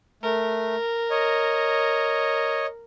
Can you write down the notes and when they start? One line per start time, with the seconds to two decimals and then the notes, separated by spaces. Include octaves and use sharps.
0.23 A3 A#4
1.10 C#5 D#5